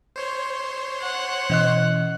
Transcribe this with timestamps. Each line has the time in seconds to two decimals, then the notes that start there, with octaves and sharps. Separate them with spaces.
0.16 C5 C#5 C6
1.02 F#5
1.50 B2 E3 C#4 D#5 F#6